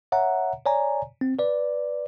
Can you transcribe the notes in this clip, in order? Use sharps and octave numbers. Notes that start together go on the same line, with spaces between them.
C#5 E5 F#5 A#5
C#5 D5 G#5 A#5
C4
B4 D5